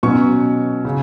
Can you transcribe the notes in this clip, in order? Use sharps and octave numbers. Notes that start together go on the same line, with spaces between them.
B2 F#3 C#4 C#6
C#3